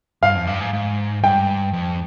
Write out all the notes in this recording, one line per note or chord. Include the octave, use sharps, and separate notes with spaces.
G2 F5
F2
G2
G#2
G#2
G2 G5
F2